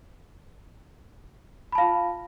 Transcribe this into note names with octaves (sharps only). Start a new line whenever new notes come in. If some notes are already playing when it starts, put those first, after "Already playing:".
F4 F5 A5 B5